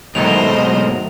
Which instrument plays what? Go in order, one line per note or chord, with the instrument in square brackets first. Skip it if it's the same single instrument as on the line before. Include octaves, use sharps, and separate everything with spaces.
[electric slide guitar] G#2 B2 [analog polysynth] D#3 F#3 A3 [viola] C5 D#5 [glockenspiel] F7